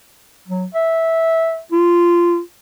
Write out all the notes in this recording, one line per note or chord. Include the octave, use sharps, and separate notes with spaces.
F#3
E5
F4